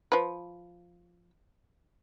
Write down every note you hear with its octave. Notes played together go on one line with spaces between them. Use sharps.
F3 B4